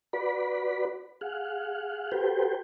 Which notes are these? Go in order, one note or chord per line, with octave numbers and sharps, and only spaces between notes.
F#4 B4 D5 B5
G#4 F5 F#5
F#4 G4 A4 B4 C5 G5